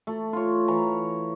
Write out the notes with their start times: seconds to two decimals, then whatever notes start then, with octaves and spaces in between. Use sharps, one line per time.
0.07 A3
0.33 F4 C#5
0.68 E3 C#5 A#5